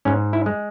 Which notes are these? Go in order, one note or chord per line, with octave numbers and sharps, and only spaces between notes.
G#2 C#4
E4
G#3